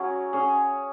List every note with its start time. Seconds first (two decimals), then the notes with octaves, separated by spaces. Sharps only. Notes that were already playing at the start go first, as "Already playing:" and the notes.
Already playing: F#3 C#4 G#4
0.33 C#4 G#4